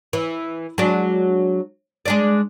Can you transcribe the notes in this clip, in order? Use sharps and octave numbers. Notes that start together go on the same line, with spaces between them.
E3
F#3 G#3 D4
G#3 D4 D5